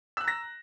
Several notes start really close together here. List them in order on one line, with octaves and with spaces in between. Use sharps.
E6 F#6 A#5 A#6